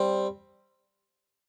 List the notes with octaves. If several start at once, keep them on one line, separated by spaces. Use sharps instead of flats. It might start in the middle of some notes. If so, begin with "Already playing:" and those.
Already playing: G3 C4